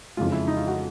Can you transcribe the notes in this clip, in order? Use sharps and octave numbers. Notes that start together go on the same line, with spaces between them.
F2 C#3 E3 G#3 F4
E4
D#4
F4
F#4